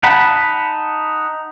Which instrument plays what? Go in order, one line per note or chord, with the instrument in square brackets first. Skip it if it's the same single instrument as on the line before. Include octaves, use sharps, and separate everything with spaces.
[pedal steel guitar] D#4 F#5 A5 B5